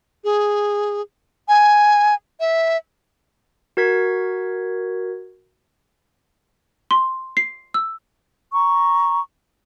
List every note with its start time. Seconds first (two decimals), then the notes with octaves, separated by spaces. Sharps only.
0.24 G#4
1.48 G#5
2.40 E5
3.77 F#4 A#4 G#6 B6
6.91 C6
7.37 C7
7.74 E6
8.53 A#5 C#6